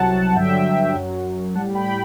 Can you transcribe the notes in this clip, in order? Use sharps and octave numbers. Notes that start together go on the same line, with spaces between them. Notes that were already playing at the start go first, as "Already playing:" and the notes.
Already playing: C2 C3 F#3 F#5 A5
G2 D3 F#3 E5 G5
F#2 F#3
A2 G3 F#5 A5
G5 B5